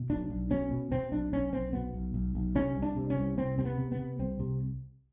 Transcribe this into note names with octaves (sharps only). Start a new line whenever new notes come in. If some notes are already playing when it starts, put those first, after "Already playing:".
Already playing: B2
B1 D4
B1
B2 C#4
B2
B2 C4
B1 D4
B1 C#4
B1 C4
B2 B3
B1
B1
B1
C3 C#4
C2
D4
C3
C#4
C2
C3 C4
C3 C4
B3
C3
B3
C3
C2 C4
C3